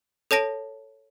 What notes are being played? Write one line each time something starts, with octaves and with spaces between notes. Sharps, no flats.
A4 C#5 A5 A#6 D7